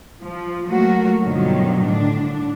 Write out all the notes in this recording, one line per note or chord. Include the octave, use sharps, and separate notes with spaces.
F3
F#3 A3 A#3 F#4 A#4
G2 B2 D3 D#3 F3 F#3
A2 D3 D4